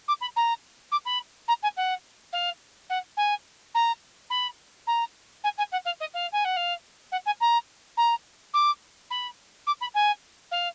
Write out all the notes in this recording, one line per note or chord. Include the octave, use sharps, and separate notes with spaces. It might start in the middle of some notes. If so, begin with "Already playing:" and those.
D6
B5
A#5
D6
B5
A#5
G#5
F#5
F5
F#5
G#5
A#5
B5
A#5
G#5
G#5
F#5
F5
D#5
F5
G#5
F#5
F5
F#5
G#5
A#5
A#5
D6
B5
D6
B5
G#5
F5